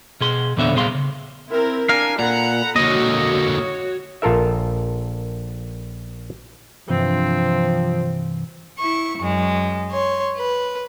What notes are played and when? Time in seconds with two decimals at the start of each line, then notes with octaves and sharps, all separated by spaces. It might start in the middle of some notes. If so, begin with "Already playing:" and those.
0.21 B2 G#4 C6
0.57 E2 A#2 D3 B3 C#5 E5
0.74 C2 A#2 B3 G#4 F5 C6
0.95 C#3
1.49 C4 E4 A#4
1.89 D4 A#4 F5 G#5
2.19 A#2 A4 F#5 A#5 B5
2.76 D3 A#3 F#4 C#5 D#5
4.22 A#1 F4 A4 A#4 E5
6.89 G2 C3 E3 F3 C4
8.78 E4 C#6
9.19 F#2 G#3
9.92 C#5 C6
10.37 B4